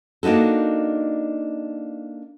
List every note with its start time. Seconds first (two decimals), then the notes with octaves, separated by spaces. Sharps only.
0.23 A#3 D4 D#4 F#4 A4